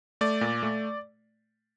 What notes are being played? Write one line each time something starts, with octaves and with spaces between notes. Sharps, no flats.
A3 D5
A#2
A3